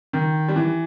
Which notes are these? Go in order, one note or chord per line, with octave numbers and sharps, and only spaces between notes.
D#3
G3
E3